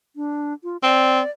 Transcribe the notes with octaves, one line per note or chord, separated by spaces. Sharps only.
D4
F4
C4 D5